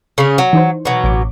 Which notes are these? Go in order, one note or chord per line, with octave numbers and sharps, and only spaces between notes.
C#3 C#4
F#3
E3 D#4 C5
B2 F#3
A1 C#5 D6